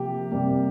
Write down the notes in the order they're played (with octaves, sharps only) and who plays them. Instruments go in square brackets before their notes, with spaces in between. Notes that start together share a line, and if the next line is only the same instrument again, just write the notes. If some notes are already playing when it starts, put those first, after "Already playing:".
Already playing: [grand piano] C3 F3 A#3 G4
C3 G3 A#3